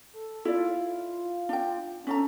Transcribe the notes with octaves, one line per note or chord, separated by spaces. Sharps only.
A4
E4 F4 D5
D4 G5
C#4 D4 A4 A#5